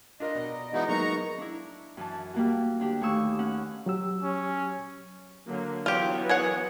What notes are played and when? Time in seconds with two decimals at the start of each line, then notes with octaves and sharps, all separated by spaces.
0.20 D4 F4 A#4 D#5
0.35 B2 D5 A#5
0.73 E3 G#3 B3 D#4 E4 F#4
0.89 F#3 G#3 A#3 B3 D#4 A#4 A#5 C#6
1.38 D4 E4
1.97 F#2 E3 A5
2.34 G3 A#3 F#4
2.80 D2 D4 G4
3.01 D#2 A3 G#5 C#6 E6
3.39 C#4 F#5
3.86 F#3 G4 E6
4.23 C#4
5.46 D3 F#3 A#3
5.86 E3 F#3 B3 F4 G4
6.29 G#4 C#5 F#5